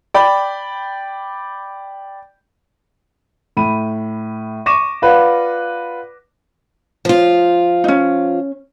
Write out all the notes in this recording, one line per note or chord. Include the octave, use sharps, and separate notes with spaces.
D5 G5 B5
A2 B5 D#7
C#6 D6 A#6 D#7 E7
F4 B4 D5 F5 F#5
F3 F4
C#4 D#4